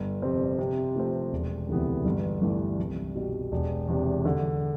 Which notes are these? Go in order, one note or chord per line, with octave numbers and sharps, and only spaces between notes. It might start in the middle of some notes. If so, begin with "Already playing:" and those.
Already playing: G1
F2 C3 G3 C4
C3
F3 A3 C4
E1
D2 C3 E3 B3
G1
G2 E3 A3
C2
B2 G3
E1
E2 C3
D3